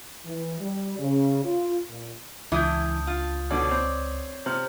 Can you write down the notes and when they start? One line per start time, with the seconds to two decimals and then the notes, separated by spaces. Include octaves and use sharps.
0.25 E3
0.60 G3
0.98 C#3
1.45 F4
1.88 A#2
2.52 C#2 E3 D4 E4 D#6 G6
3.07 F4
3.51 B2 D3 C#5 D5
3.71 C4
4.46 C3 C5 F6